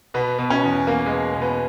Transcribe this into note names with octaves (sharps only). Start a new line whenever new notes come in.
B2 B3
B2
C#4
E2
E2 A#3
G#3
B2
B2
B3